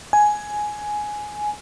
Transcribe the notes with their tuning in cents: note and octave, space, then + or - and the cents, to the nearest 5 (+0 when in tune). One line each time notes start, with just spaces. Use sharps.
G#5 +10